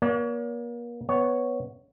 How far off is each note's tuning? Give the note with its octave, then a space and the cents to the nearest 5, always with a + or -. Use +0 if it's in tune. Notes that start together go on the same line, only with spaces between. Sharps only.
A#3 +40 C#5 +45
B3 +0 C#5 +0